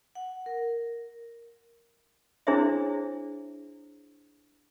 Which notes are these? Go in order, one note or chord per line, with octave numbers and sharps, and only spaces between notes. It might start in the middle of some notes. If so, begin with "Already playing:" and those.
F#5
A#4
D4 E4 G#4 C5 C#5 E5